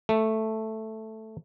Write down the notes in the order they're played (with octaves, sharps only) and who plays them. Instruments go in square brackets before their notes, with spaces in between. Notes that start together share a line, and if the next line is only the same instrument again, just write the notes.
[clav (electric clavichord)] A3